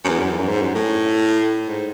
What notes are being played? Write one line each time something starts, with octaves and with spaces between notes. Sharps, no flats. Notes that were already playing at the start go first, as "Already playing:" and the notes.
F#2
E2
F#2
E2
F#2
G#2
F#2
A2
G#2